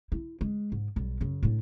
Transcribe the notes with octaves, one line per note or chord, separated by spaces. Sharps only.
E4
G#3
G#2
B1 G3
F#2 C#3
A2 D4